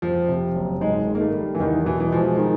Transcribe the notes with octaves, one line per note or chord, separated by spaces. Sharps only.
F2 F3
C3
F#1
G#2 G#3
D#3
A#3
A3
G3
E3
E2 D#3
B2 E3
E3
F3 G#3
D#3